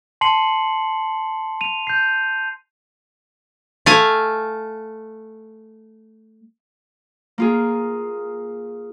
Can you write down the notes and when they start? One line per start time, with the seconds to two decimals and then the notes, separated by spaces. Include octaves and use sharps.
0.21 A5 C6 C7 C#7 F#7
1.61 D#7 F7
1.87 G6 C7
3.86 A3 F5 G#5
7.38 A#3 F4 G#4